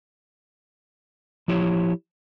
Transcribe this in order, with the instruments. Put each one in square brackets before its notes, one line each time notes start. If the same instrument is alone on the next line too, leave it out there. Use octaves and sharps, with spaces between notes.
[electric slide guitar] F3 E4 G4 C#5